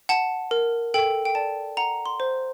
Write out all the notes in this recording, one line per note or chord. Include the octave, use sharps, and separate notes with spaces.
F#5 A5
A#4
A4 G5
G5
D5 A5
F#5 A#5
C6
C5